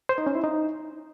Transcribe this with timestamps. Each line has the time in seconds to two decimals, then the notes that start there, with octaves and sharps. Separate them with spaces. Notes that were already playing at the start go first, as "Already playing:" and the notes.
0.09 C5
0.18 D#4
0.26 C#4
0.35 E4
0.44 D#4